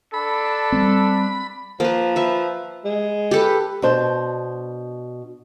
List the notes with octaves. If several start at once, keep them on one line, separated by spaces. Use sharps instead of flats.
D4 A4 B5
G3 G#3 C4
F3 A#3 B4
B4 E5
G#3
G4 A4 B4
B2 D4 C5